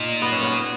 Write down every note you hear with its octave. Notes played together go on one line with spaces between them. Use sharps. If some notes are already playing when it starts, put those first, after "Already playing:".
Already playing: A#2 D#4
B3
C#4
B3